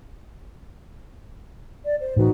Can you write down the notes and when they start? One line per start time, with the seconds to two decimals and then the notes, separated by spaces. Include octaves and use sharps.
1.86 D5
2.00 C5
2.16 A2 E3 D#4 F#4 B4